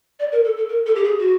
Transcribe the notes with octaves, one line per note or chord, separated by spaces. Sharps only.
D5
A#4
A4
A4
A#4
A4
G4
G#4
F#4